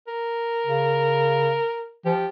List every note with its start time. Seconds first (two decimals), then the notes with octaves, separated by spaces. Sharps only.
0.08 A#4
0.67 C#3
2.06 F3 G4